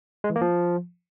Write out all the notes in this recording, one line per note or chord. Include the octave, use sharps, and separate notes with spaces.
G#3
E3
A#3
F3